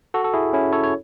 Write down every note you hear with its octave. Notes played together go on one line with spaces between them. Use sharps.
F#4 A4
A4
E4 G#4
C#4 E4
A4 C#5
C#5